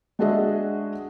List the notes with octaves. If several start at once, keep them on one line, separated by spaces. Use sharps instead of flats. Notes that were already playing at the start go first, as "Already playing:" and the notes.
G#3 D4 F#4 G#4 D#5 E5